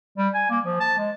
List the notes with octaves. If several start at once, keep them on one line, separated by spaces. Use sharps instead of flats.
G3
G#5
A#3
F3
A5
G#3